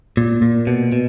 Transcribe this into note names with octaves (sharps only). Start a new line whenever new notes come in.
A#2
A#2
B2
B2